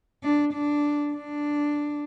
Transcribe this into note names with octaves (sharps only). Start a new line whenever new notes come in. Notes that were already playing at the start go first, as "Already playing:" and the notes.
D4
D4
D4